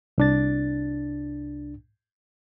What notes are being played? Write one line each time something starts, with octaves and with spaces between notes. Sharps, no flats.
C2 D4 A6